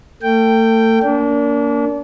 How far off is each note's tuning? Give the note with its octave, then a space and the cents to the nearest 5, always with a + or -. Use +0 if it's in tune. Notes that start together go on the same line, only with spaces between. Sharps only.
A3 +35 G5 -5
A#3 +0 D4 -35